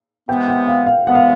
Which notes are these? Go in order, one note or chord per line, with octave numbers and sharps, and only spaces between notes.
C3 E3 G#3 B3 G5
F#5
F5
F5
C3 E3 G#3 B3 F#5
F5